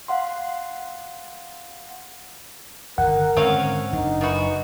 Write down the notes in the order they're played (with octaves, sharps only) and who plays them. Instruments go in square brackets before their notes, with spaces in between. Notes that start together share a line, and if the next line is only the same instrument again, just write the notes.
[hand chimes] F5 F#5 C6
[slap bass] G1 D3 D#3 [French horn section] A#4 [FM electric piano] F#5
[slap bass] G#2 D3 D#3 [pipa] C4 C#4 F5
[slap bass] F#1 F#3 D4 [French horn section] D#4
[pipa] D#3 E3 F#4